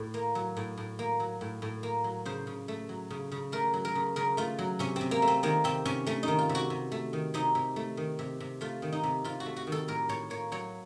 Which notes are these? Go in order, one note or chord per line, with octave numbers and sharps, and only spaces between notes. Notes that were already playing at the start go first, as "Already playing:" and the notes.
Already playing: A2
A#3
F#3
A2
A2
A#3
F#3
A2
A2
A#3
F#3
C#3 C5
C#3
A3
F#3
C#3
C#3
A3 A#4
F#3
A#4
C#3
C#3 A#4
A3 F4
F#3
C3 C#4
C4
C3
A#3
A3
C4
D#3 A#3
C3 C4
C3 C#4
A3 C#4
D#4
D#3
F4
C3
F#4
C3
A3
D#3
C3 D#4
C3
A3
D#3
C3
C3
A3 F4
D#3
D#4
C3
C3 F4
F#4
A3
F#4
D#3
A4
A2 A#4
A2 C#5
A#3 C#5
F#3 C#5